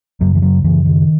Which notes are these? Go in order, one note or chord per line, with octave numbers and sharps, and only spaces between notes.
F#2 C#3 F#3
E3
F#3
F#2 C#3 E3
D#3